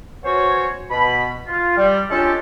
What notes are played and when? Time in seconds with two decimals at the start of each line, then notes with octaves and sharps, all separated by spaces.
0.24 B3 C#4 F#4 C5 C#5
0.91 B2 B5
1.47 F4
1.77 G3
2.10 G#3 C#4 D4 F4 G4 A4